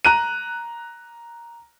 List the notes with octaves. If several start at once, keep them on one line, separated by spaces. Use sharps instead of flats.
A#5 F#6 D#7